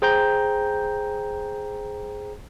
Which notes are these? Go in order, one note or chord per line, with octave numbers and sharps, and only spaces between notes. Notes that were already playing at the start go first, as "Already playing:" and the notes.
G#4 C5 G5 A#5 G6